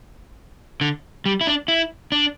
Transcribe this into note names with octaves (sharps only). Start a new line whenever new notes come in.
D3
G3
E4
D4
E4
D4